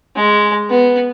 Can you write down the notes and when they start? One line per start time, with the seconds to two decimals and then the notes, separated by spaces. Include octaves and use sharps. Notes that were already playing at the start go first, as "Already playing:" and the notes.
0.16 G#3
0.70 B3